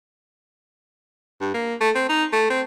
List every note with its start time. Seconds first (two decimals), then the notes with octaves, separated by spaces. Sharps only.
1.41 G2
1.54 A#3
1.81 A3
1.95 C4
2.09 D#4
2.33 A3
2.50 C4